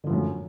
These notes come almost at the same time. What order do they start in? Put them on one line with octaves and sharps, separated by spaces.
D3 F3 A2 F#2